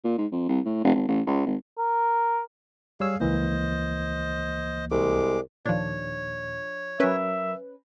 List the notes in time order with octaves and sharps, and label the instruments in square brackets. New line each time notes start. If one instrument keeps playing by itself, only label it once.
[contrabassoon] A#2
G#2
F2
C2
A2
F1
G#1
A1
C#2
G#1
[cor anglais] A#4
[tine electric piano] G3 C#5 E6 [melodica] G#4 F5
[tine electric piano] C#2 E3 A#3 [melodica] C5 D#5
[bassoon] C2 [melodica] G#3 D6
[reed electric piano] D#2 A#2 [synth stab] F3 D4 [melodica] C#5
[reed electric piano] F#3 A#4 [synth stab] C#4 B4 [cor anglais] E5